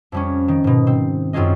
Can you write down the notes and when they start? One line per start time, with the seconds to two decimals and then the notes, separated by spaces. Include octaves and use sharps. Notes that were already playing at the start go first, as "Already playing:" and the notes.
0.12 F2 G3 C#4
0.48 D#3
0.64 G#2 B2
0.87 C4
1.33 F#2 C4 F4 G#4 D#5